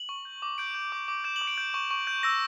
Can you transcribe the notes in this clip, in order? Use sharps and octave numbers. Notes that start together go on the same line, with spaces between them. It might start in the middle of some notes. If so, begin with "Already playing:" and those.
Already playing: F#7
C#6
G6
D6
G6 D7
G6
D6
D6
G6 E7
F#7
D6
D7
G6
C#6
C#6
G6
E6 A#6